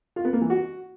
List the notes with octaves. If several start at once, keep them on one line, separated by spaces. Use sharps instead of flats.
F4
B3
A#3
E3
F#4